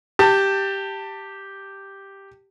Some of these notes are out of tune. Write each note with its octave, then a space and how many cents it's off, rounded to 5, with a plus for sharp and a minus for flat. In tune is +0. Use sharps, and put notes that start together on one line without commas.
G4 +0 A5 +25